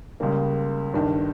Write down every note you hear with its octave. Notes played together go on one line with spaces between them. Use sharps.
C#2 C#3 G3 A#3
G1 G2 D#3